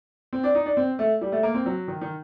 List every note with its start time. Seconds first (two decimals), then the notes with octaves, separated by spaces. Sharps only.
0.33 C4
0.43 D4
0.55 D#4
0.66 D4
0.77 C4
0.99 A3
1.21 G3
1.32 A3
1.43 A#3
1.54 C4
1.66 F#3
1.88 D#3
2.01 D#3